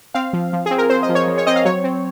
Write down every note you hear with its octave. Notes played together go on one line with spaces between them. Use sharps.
C4 F5
F3
F3
C4 G#4
A#4
C4 C5
D#5
F3
C#5
F3
C#5
C4 D#5
F5
F#3 C#5
C4